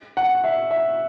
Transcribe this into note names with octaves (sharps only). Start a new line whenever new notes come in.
F#5
E5
E5